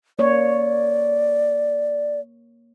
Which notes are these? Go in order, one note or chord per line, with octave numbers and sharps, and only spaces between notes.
A#3 C#5 D5